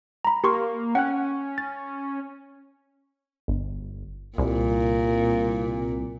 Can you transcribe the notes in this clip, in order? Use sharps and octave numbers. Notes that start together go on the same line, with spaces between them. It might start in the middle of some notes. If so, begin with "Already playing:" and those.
A#5 B5
A#3 G4 C6 C#6
C#4 F#5 G5 F#6
A6
G1
C2 A#2